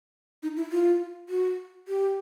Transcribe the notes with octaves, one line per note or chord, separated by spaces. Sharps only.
D#4
E4
F4
F#4
G4